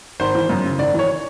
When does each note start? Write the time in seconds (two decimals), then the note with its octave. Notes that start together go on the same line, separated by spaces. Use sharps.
0.20 G#1 C5
0.35 E3
0.49 F#2
0.64 C#3
0.79 G#1 D5
0.94 E3 C#5